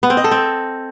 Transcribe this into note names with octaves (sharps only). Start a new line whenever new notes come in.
B3
C4
D#5
A4
C4